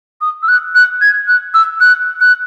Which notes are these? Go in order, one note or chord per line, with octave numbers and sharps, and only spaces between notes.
D#6
E6
F#6
F#6
G#6
F#6
E6
F#6
F#6